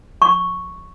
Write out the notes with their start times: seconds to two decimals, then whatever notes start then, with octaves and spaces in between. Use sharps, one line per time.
0.22 C#6